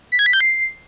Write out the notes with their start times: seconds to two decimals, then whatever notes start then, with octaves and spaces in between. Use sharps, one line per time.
0.12 B6
0.19 G#6
0.26 B6
0.33 G6
0.41 C7